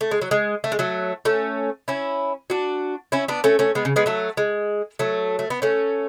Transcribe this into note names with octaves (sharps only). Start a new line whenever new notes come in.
A3
G#3
F#3
G#3
A3
G#3
F#3 A3
A3 C#4
C#4 E4
D4 F#4
C#4 E4
B3 D4
A3 C#4
A3 C#4
G#3 B3
C#3
G#3 B3
F#3 A3
G#3
F#3 A3
A3
B3
A3 C#4